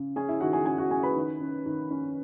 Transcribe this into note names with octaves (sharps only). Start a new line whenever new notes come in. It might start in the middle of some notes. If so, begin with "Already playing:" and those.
Already playing: C#3
C#4 G#4 G#5
E4 E5
D#3 F#4 F#5
G#4 G#5
C#4 G#4 G#5
F#4 F#5
C#4 G#4 G#5
B4 B5
D#3
C#4
D#3
C#4